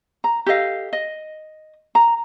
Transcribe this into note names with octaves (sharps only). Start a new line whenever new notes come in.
A#5
G4 A4 D#5 F5
D#5
A#5